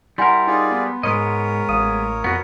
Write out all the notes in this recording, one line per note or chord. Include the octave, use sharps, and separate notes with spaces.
G3 E4 A#4 F#5 G#5 C6
D#4 F4 G#4 D5
B3
G#2 G#3 B3 A#4 C#5 D#5
A1 F5 D#6 D#7
F2 B3 F#4